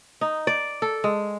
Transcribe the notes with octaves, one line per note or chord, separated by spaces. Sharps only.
D#4
D5
A4
G#3